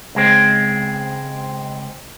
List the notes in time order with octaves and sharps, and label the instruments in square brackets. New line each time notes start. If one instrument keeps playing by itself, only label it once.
[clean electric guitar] C#2 G#3 C4